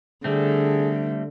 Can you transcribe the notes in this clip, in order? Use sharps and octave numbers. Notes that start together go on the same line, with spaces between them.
D3 G3 A3 C4 G#4